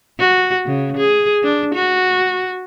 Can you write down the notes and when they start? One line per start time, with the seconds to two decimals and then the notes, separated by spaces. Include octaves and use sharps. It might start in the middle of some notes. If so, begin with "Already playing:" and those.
0.19 F#4
0.66 C#3
0.97 G#4
1.43 D4
1.75 F#4